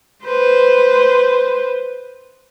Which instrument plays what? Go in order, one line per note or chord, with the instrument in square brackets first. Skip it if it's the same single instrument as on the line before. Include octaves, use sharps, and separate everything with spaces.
[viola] B4 C5